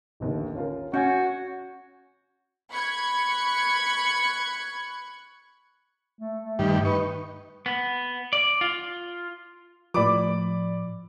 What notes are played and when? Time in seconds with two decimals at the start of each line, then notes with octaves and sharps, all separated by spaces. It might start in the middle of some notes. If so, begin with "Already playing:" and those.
0.20 A1 D#2 D3
0.55 C#4 F4 A#4
0.94 C#4 F#4 G6 G#6
2.71 B5 C#6 F#6 G#6 C#7
6.20 A3
6.44 A3
6.59 G2 D#3 G4
6.85 D#4 B4 C#6
7.66 B3
8.33 D5
8.61 F4
9.94 A2 F3 D5 B5 D6